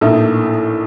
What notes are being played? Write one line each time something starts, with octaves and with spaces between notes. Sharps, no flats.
A#1 A2 A3 D#4